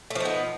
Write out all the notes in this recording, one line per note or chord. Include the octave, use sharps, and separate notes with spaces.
F3 A3 B3 D#4